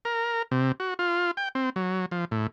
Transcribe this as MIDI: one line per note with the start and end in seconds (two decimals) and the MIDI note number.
0.05 0.42 70
0.51 0.72 48
0.80 0.94 66
0.99 1.31 65
1.37 1.49 79
1.55 1.70 60
1.76 2.06 54
2.11 2.25 53
2.31 2.47 45